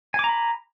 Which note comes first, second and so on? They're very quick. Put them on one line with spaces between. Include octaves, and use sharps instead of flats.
G#5 D6 A#5 B5